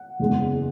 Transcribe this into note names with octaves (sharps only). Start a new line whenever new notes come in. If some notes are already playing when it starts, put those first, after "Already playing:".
Already playing: F#5
F#1 E2 E3 G#3